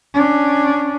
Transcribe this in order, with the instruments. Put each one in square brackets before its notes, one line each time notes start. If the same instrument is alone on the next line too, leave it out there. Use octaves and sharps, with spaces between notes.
[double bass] C#4 D4